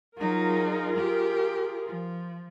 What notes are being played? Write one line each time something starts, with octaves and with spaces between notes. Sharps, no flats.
F#3 D#4 F4 G#4 A#4
G4
F3